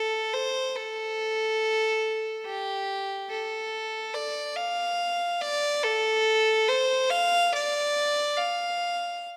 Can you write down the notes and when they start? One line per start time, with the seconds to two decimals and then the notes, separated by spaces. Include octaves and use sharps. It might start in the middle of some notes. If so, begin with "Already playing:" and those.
Already playing: A4
0.33 C5
0.76 A4
2.46 G4
3.29 A4
4.14 D5
4.57 F5
5.41 D5
5.83 A4
6.69 C5
7.10 F5
7.52 D5
8.37 F5